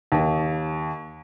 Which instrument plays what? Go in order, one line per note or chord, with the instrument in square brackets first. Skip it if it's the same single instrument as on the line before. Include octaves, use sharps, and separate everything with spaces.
[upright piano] D#2